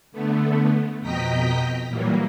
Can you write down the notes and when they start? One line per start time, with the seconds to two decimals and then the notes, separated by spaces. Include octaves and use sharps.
0.12 D3 A3 B3
1.01 F2 B2 D#5 G5 A#5 B6
1.88 A#2 E3 F#3 G3 A#3